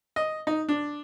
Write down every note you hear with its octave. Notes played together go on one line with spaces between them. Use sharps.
D#5
D#4
D4